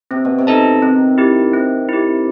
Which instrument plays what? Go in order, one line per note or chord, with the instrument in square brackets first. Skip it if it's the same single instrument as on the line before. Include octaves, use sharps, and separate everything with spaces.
[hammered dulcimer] C3 [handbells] C4
[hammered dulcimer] B2
C3
[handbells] D#4 A4 D#5 A5
[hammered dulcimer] D#3 [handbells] C4
[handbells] E4 G4
[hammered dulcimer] C3 [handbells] C4
[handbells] E4 G4